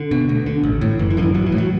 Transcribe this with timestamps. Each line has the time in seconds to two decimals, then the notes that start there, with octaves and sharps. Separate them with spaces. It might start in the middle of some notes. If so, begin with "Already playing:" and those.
Already playing: D3
0.11 B2
0.29 D2
0.46 D3
0.64 A1
0.81 A2
0.99 F#1 E3
1.11 E3
1.17 F#2 D3
1.22 E3
1.34 A1 F#3
1.46 E3
1.52 A2
1.58 F#3